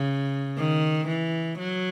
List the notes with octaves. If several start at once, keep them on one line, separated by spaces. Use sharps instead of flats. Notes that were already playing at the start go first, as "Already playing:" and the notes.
Already playing: C#3
D#3
E3
F#3